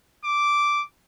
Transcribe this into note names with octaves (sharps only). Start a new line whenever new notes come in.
D6